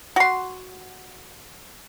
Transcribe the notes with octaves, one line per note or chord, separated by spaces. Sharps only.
F#4 C6